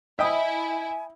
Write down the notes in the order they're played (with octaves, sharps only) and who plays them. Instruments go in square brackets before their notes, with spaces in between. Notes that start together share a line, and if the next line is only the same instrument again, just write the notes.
[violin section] E4 [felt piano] D#5 [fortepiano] E5 G5 D#6 [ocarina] G#5